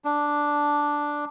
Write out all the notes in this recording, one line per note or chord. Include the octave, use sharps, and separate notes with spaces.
D4